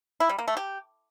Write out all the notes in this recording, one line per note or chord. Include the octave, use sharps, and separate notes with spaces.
E4
G3
A#3
A3
G4